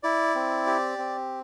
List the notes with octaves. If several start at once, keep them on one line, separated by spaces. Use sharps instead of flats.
E4 D5
C4
G4
C4